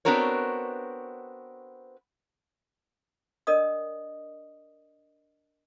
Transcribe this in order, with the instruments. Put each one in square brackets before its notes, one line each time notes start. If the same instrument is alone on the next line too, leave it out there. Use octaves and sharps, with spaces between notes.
[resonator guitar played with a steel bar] B3 C4 D4 F#4 A#4 C#5
[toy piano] D4 A#4 D5 D#5 D#6